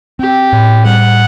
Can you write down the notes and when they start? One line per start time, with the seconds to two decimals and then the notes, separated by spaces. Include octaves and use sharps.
0.19 C4 G4
0.53 A2
0.85 G3 F#5